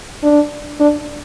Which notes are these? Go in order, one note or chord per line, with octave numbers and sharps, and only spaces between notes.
D4
D4